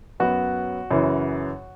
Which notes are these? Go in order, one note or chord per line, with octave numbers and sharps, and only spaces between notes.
F#2 F#3 B3 F#4
F#2 C#3 E3